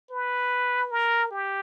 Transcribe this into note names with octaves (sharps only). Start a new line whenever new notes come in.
B4
A#4
G4